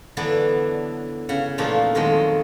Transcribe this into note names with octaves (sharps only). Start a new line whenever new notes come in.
D3 E3 F#3 B3 D4
C#3 F#5
E2 A#2 F3 A3 D4 D#4
F2 D#3 F#3 G#3 A3